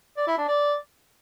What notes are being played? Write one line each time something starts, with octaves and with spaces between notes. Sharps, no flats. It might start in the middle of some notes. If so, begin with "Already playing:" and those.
D5
E4
D4
D5